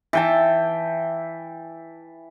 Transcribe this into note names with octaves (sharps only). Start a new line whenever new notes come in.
E3 G5 A5